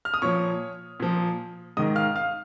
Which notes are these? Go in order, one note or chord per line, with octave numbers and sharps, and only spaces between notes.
F6
D#6
A#2 F3 C#5 C#6
A#2 F3
G#2 D#3 D#5 D#6
F5 F6
F5 F6